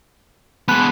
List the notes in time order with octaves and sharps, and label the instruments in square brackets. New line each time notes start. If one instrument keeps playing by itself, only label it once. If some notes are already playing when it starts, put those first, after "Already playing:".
[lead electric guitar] G#3 B3 [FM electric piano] A5 B5 F#6